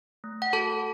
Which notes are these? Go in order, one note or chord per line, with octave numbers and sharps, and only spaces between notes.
A3
F#5
F#4 A4 A5